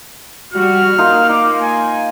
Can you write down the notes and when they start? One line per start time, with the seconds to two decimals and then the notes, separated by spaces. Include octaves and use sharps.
0.53 G3 F#4 F6
0.98 A#3 D#4 F4 A#4
1.29 D#4 D6
1.62 G#5